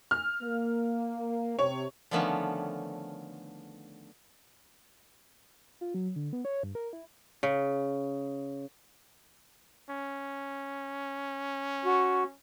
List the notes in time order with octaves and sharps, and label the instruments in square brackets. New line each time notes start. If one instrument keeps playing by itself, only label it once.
[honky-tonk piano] F6
[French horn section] A#3
[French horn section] C3 [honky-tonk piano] C#5
[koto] D3 D#3 F3 A3 B3 C#4
[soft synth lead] F4
F#3
D3
B3
C#5
G2
A#4
E4
[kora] C#3
[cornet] C#4
[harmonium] F#4